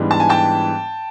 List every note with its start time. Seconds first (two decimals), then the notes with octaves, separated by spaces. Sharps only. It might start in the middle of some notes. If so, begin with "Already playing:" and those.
Already playing: G#2 E3 G3 B3 D4
0.11 A5
0.20 G#5
0.29 G5 A5